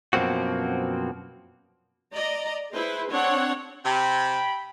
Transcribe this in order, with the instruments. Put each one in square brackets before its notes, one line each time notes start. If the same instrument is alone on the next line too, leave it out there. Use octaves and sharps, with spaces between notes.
[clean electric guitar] F#2 B2 F3 A#3 C4 F#4
[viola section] D5 D#5 A#5
E4 G#4 B4 C5
C4 D4 C#5 F#5
[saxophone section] C3 [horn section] G5 B5